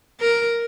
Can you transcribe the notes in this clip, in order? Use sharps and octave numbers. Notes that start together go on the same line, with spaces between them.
A#4